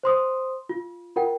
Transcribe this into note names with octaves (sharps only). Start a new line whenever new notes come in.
C5 C6 D#6
F4
F4 A#4 F#5 G5